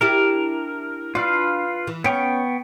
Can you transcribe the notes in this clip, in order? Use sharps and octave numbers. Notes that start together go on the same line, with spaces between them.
D4 E4 G4 A#4
D4 F4 B4 F5
E3
B3 C#4 G5 C#6